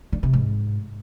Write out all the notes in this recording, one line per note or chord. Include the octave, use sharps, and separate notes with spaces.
D3
C3
G#2